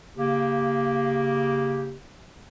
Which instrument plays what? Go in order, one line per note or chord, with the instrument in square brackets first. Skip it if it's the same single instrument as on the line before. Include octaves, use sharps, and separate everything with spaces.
[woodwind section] C#3 A#3 G4